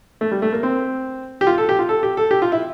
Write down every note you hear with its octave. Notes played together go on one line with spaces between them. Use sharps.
A3
G3
A3
A#3
C4
G4
F4
A4
G4
F4
A4
G4
A4
G4
F4
E4